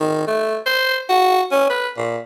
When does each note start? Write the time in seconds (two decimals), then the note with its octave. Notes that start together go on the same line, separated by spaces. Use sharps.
0.01 D#3
0.27 A3
0.66 C5
1.09 F#4
1.52 C#4
1.70 B4
1.97 A#2